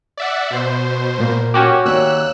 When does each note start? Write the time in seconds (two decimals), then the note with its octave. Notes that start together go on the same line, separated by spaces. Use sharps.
0.17 D5 E5 F#5
0.50 B2 C5
1.18 A#2 A#3
1.54 C#4 F#4 G4
1.85 D#2 C#5 D5 E6 F#6